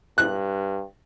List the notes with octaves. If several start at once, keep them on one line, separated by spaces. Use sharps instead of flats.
G2 F#6